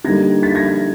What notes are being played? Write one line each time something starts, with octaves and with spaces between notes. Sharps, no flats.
D3 G3 A#3 D#4 G#6 A#6
A6 B6
G#6 A#6